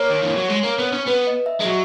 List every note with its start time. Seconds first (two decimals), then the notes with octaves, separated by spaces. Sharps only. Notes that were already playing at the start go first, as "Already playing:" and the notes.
Already playing: A#3 C#5
0.10 D#3
0.23 E3
0.37 F#3
0.50 G#3
0.64 A#3
0.79 B3
0.93 C#4
1.07 B3 B4
1.27 D#5
1.46 E5
1.61 G#3
1.65 F#3 D#5